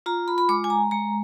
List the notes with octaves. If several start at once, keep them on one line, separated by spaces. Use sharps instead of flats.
F4 A#5
B5
B5
G#3 D6
G#5
A#5
G#3 A#5